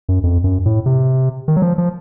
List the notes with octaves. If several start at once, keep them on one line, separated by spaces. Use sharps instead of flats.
F#2
F2
F#2
A2
C3
D#3
F#3
F3
F3